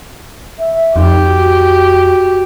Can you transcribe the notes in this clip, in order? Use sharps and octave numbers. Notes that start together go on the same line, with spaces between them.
E5
F2 D#4 G4
F#4